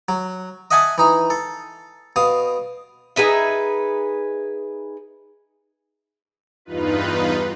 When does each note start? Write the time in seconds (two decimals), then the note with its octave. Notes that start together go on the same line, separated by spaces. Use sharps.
0.09 F#3
0.71 D#5 E5 F#5 G#5 A5 D#6
0.98 E3 D#4 A#5
1.30 A4
2.16 B2 F5 D#6
3.16 D#4 G#4 B4 E5
6.65 E2 G2 D#4 F4 B4